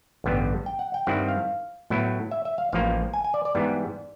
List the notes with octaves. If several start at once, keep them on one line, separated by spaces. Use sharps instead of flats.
A1 G2 D3 G3 B3
G5
F#5
G5
G2 D#3 G3 C4 E4 F#5
F5
A2 F#3 B3 E4
E5
E5
F5
A1 A2 F3 A#3 F5
G#5
G#5
D5
D5
G#2 E3 G3 B3